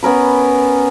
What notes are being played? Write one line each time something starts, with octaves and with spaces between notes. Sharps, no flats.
B3 C#4 A#4 B5